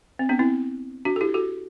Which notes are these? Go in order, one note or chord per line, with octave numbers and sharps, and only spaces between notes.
C4
B3 D4
C4 E4
D4 F#4
A4
E4 G4
F#4 A4